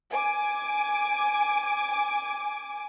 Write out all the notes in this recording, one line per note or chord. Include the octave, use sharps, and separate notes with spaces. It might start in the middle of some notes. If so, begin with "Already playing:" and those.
G#5 D6